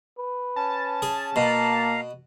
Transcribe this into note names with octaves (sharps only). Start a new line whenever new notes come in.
B4
C#4 A5
G#4
B2 A#3 F5 A#5